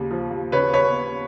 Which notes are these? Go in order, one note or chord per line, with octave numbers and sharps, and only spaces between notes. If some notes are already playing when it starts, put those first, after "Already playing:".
Already playing: D#2 C#3
F3
D#2
C#3 B4 C#5
B4 C#5